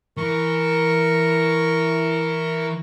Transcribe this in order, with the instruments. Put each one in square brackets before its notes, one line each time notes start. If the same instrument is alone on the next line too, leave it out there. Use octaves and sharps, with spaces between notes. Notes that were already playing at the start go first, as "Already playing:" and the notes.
[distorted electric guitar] E3 [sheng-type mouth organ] A#4 C#6